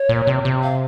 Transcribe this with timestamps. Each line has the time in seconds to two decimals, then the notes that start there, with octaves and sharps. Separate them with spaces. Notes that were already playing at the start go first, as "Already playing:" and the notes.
Already playing: C#5
0.09 A#2
0.27 C3
0.45 C3
0.63 F5